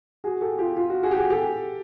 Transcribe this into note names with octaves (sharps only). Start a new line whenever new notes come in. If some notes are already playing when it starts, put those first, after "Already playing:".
F#4 G#4
G4 A4
F4 G4
F4
F#4
F#4 G#4
G4
F#4 G#4
G4 A4